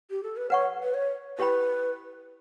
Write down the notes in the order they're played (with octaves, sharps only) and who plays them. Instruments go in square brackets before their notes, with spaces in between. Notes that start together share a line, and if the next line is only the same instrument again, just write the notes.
[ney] G4
A4
B4
[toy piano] B4 F#5 C#6 [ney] C#5
[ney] B4
C#5
[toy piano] E4 G4 C#5 G5 B5 [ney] B4